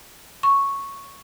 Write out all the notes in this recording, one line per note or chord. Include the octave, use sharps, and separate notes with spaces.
C#6